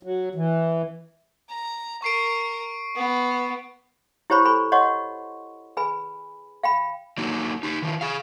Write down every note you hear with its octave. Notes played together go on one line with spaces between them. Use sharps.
F#3
E3
A#5
A#4 C#6 C7 D7
B3
E4 G4 C5 C#5 B5 C#6
A4 C5 G#5 B5 C#6
C#5 D#5 F#5 C6 C#6
G#4 B4 G#5 B5
F5 G5 B5
F#3 A#3 D#4
D#4 G4
D#3 F3
G#4 F5